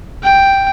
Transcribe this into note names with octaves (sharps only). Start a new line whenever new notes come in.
G5